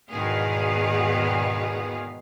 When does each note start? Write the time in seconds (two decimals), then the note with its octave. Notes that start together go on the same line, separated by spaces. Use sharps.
0.11 E2 G#2 B2 D#3 G#4 F5